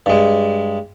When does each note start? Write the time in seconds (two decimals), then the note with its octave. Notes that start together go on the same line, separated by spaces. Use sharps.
0.06 G2 G#3